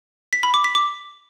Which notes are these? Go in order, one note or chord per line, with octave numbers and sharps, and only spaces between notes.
B6
B5
D6
B6
D6